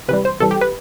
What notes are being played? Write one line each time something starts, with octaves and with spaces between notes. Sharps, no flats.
C3 E3 G3 B4
C5
C3 E3 G3 A4
G4
B4